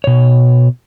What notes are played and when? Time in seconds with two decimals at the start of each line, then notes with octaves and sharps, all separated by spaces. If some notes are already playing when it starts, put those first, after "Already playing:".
0.04 B2 C#5